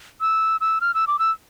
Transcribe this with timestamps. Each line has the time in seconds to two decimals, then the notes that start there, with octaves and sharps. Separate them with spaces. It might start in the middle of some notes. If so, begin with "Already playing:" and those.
0.21 E6
0.61 E6
0.81 F6
0.94 E6
1.07 D6
1.19 E6